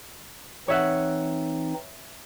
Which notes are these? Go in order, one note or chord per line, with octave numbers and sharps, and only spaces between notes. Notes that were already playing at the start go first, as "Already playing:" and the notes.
E3 C4 D#4 C#5 E5 F#5